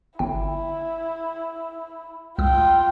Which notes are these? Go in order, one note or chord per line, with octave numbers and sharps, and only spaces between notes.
G1 E4 G5
C#2 F4 G5 D#6 E6